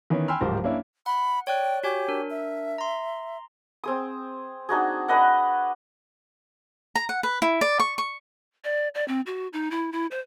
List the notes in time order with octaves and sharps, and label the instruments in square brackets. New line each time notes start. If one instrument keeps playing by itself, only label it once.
[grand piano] D#3 E3 B3 C#4
G5 G#5 B5 C6 E6 F6
D1 G#2 F3 G4 A#4 C5
A#3 C#4 D4 E4
[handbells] F#5 [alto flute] B5
[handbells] C#5 D5 F#6 [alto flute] G5
[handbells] F#4 C#5 G#5 [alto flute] G4
[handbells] D4 A#4
[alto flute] E5
[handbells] A#5 C6
[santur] C4 G#4 D#6
D4 D#4 F#4 G#4
D4 B4 D#5 F#5
[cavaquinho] A#5
F#5
B4
E4
D5
C#6
C#6
[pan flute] D5
D5
C4
F#4
D#4
E4
E4
C5